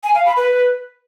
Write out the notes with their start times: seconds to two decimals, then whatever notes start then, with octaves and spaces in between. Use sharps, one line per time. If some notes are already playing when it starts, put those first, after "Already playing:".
0.04 G#5
0.15 F5
0.26 B5
0.37 B4